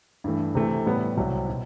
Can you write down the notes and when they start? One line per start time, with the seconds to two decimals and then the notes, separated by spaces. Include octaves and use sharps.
0.24 G2 E3 A3
0.55 C3 E3 A3
0.86 A2 G3 B3
1.17 C2 C3 F#3
1.49 B2